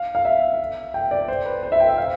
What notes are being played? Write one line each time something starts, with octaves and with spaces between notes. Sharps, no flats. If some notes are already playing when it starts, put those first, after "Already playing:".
Already playing: F5
F5
E5
G5
D5
C5
B4
C5
E5
G5
E5
F5